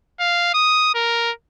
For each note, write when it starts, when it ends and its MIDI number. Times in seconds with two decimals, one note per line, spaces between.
0.20 0.51 77
0.54 0.91 87
0.95 1.31 70